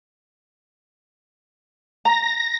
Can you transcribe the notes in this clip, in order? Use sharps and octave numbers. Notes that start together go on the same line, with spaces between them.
A#5 A#6